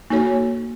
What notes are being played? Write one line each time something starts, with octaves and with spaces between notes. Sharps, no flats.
A#3 D#4 F#4 A4 C#5